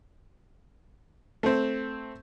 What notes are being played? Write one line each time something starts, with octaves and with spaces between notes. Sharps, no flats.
A3 C4